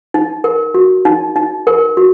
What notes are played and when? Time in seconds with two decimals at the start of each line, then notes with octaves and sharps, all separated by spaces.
0.14 D#4
0.44 A#4
0.75 F#4
1.05 D#4
1.36 D#4
1.67 A#4
1.97 F#4